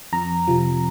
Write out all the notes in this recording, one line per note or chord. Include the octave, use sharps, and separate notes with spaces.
F2 A#5
C3 F3